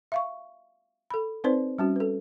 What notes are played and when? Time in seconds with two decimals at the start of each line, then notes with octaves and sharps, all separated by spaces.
0.12 E5 F5 C#6
1.10 A4 B5
1.44 C4 D#4 B4 C5 D5
1.78 G3 C#4 F#4
1.96 A4 B4